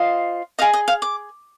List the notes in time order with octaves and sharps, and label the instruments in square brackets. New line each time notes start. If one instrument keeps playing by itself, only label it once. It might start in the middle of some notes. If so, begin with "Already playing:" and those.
Already playing: [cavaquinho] F4 C5 D#5
G#4 D#5 F5
D#5
F5
D6